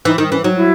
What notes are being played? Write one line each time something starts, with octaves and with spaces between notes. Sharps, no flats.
E3 D#4
D#3 D#4
E3 C#4
F#3 D#4
E4